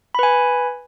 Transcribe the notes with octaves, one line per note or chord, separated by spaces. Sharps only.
B4 G#5 B5